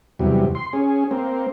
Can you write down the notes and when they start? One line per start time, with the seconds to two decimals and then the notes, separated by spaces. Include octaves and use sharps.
0.19 E2 C3 F#3 G3
0.55 C6
0.73 C#4 G#4
1.11 A#3 C4